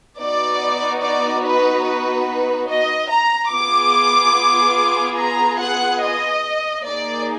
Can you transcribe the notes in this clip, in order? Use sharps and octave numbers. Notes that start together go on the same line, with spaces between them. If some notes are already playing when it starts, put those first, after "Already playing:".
B3 D#4 F#4 D5
D5
B4
B4
D#5
A#5
B3 F4 G#4 D6
A#5
F#5
D#5
A#3 D#4 G#4 D5